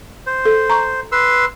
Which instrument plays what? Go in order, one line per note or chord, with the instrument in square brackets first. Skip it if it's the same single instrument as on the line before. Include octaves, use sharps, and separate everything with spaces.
[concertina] C5
[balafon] A4
A#5 C#6
[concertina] B4 C6 E6